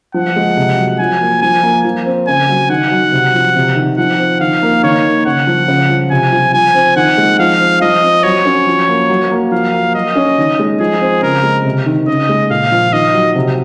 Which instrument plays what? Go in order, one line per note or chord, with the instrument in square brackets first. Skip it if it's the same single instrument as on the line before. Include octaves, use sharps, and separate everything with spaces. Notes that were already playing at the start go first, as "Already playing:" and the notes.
[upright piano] F3 [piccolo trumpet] F#5
[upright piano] G#3
C3
F#3
[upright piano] F3 [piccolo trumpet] G#5
[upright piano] A#3
[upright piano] F3 [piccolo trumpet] G#5
[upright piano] A#3
F3
C4
[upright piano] C#3 [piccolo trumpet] G#5
[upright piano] F#3
[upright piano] D#3 [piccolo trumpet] F#5
[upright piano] F#3
C3
F3
C3
D#3
[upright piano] F3 [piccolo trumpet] F#5
[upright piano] C4
[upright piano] D#3 [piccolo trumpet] F5
[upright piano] A#3
[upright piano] D#3 [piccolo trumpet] C#5
[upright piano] A#3
[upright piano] C#3 [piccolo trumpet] F#5
[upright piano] F3
C#3
F3
[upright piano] C3 [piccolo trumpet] G#5
[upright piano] F3
[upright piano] F3 [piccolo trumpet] G#5
[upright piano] C4
[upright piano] D#3 [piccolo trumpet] F#5
[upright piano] G#3
[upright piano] F3 [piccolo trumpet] F5
[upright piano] C4
[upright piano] F3 [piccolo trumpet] D#5
[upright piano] C4
[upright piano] F#3 [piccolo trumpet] C#5
[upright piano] C#4
F3
A#3
F#3
A#3
[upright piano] F3 [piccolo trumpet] F5
[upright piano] A#3
[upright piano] F#3 [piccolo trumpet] D#5
[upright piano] C#4
D#3
G#3
[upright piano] F3 [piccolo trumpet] G#4
[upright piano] C4
[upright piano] C#3 [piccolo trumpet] A#4
[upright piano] G#3
C3
D#3
[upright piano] C#3 [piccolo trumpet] D#5
[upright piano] G#3
[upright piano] A#2 [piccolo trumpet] F5
[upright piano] F3
[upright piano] D#3 [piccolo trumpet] D#5
[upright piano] F#3
C3